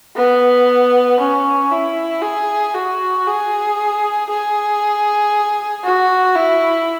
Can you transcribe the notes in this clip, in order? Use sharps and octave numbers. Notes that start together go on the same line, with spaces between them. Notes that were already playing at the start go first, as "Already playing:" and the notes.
B3
C#4
E4
G#4
F#4
G#4
G#4
F#4
E4